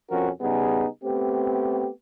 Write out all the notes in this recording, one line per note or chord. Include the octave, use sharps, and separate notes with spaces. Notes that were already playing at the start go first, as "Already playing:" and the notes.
F2 B2 F3 C#4 F#4 A#4
C#3 G3 B3 D#4 G#4
A3 B3 C4 G4